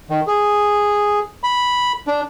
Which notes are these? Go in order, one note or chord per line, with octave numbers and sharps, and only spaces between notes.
D#3
G#4
B5
D4